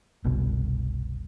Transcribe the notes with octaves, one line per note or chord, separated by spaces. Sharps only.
F#1 C2 B2